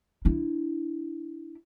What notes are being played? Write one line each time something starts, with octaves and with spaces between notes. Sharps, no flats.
D4 E4